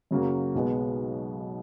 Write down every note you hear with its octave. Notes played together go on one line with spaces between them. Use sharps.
F#2 C#3 F#3 A#3
B1 B2 G#3 B3